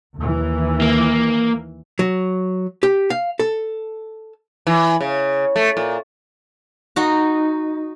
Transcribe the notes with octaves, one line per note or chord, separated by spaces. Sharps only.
D#2 E3
A#3
F#3
G4
F5
A4
E3
C#3
A3
A#2
D#4 F#4